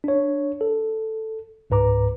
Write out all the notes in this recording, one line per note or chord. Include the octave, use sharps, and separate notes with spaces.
D4 C#5
A4
C#2 G#2 B4 A#5 D6